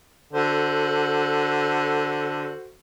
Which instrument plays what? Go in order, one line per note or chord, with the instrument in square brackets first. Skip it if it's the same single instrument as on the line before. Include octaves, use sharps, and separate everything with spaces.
[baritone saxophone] D3 [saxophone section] F#4 A4 C5